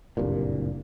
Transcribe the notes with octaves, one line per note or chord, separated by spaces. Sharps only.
F#1 C2 G2 A#2